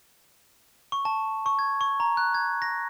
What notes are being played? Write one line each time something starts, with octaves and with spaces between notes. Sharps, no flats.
C#6
A5
C#6
G#6
C#6
A#5
F#6
G#6
A#6